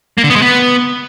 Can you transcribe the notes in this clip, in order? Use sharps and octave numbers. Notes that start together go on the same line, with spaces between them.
A#3
D3
B3
G#3
B3